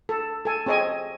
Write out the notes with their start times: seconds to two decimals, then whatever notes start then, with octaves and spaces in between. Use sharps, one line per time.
0.09 A4
0.45 A4 G#5
0.66 C4 G#4 C#5 D#5 G#5